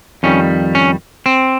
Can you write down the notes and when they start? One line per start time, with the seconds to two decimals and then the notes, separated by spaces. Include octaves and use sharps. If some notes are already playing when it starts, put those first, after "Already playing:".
0.23 F2 D#3 G3 C#4
0.75 C#4
1.26 C4